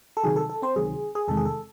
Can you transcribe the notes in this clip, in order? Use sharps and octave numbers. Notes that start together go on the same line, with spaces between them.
A4
C#2 C3 D#3 F#3 G#4
A4
A4
C4 C5
C#2 C3 D#3 F#3 G#4
G#4
E2 C3 D#3 G#3 A4
G#4
A4